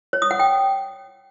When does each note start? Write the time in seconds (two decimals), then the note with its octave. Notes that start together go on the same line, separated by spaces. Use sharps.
0.13 C#5
0.22 D#6
0.31 F#5
0.39 G5